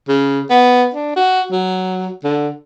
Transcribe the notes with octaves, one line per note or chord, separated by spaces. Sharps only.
C#3
B3
D4
F#4
F#3
D3